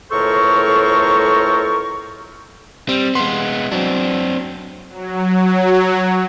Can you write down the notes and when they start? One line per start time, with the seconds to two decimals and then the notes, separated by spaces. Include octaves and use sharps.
0.11 C#2 A2 A4 A#4 C5 C#6
2.89 G3 C4
3.15 G#3 B3 C6
3.72 F#3 C4 D4
4.90 F#3